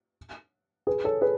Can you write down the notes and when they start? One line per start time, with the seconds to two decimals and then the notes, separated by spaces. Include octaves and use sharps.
0.87 G#4 B4
1.04 A4 C#5
1.21 G#4 B4